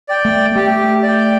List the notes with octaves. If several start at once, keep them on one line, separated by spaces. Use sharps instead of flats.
D5 G5
A3
A3 G4
D5 G5